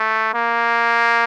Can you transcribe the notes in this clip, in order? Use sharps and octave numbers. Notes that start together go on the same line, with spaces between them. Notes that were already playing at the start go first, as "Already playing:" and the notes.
Already playing: A3
A#3